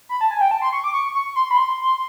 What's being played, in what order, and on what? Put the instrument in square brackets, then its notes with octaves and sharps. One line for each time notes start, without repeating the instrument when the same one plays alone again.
[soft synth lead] B5
A5
G#5
G5
A5
C6
C#6
D6
C#6
C#6
C6
B5
C6